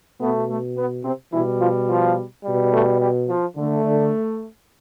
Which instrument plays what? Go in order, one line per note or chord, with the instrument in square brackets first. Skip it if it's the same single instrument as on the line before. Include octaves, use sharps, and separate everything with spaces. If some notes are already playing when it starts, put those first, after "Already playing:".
[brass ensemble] B2 A3 B3
A3
B3
C3 C4
B2 E3 G3 E4
F3 F4
F3 F4
B2 G3
A3 A4
G3 G4
F3 F4
D3 A3
D3 D4